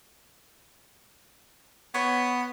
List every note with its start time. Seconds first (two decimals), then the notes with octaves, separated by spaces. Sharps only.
1.94 B3 C#5